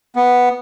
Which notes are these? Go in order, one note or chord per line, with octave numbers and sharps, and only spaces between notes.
B3